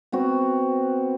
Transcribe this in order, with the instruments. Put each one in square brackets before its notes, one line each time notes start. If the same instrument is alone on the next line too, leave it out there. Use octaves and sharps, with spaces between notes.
[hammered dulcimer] B3 C4 F#4